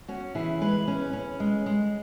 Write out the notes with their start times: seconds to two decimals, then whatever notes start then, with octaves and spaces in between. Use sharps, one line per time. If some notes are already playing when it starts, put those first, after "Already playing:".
0.08 C#4 F#4
0.35 E3 E4 G#4
0.61 G#3 G#4 B4
0.88 C#4
1.13 C#4
1.40 G#3
1.66 G#3